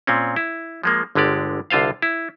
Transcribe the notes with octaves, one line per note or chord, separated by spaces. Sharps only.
A#2 C4 C#4
E4
F3 G#3 A#3
G1 D3 G#3 G4 D5
C2 D3 F4 C5 F5
E4